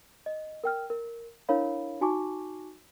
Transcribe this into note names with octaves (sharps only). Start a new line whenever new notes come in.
D#5
A#4 G5 F6
A#4
D4 E4 A#4 C#5 F5 B5
D#4 F#4 G#5 A5 C#6 D6